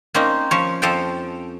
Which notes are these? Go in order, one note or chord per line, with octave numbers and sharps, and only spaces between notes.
A#3 C4 C#4 D#4
F3 C#4 C#5
F2 F3 A4 F5 G5